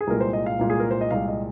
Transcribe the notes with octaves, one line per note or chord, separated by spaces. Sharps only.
G#4
C2 A#2 G#3 A#4
C5
D#5
F5
C2 A#2 G#3
G#4
A#4
C5
D#5
C2 A#2 G#3 F5
D#5